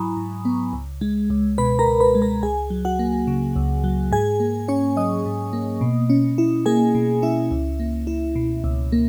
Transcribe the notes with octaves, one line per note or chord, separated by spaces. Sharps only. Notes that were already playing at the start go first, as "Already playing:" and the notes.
Already playing: G#2 F#3 E4 G#5 A#5 B5 C#6 D#6
G#2
B3
C#2
G#3
C#2
B2 B4 B5
A#4 A#5
C#2
B4 B5
G#3
A#4 A#5
C#2 G#4 G#5
F#3
F#4 F#5
A#3
C#3
C#2
F#3
G#2 G#4 G#5
A#3
C#4 C#5 C#6
F#3 D#5 D#6
G#2
A#3
B2
C#4
E4
A#3 G#4 G#5
B2
C#4 E4 E5
C#2
A#3
E4
B2
C#2
A#3